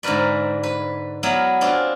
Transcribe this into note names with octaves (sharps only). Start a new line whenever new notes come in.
G#2 D3 A#4 B4 D5
B4
F#3 B3 E4 A#4 D5
C4 D4 F4 G#4